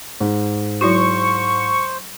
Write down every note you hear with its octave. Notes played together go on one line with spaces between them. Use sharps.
G#2
F#3 E4 F#4 C5 C#6